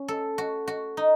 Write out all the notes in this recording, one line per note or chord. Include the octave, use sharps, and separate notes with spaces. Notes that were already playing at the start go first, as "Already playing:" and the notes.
Already playing: C#4
A4
F#4
F#4
D#4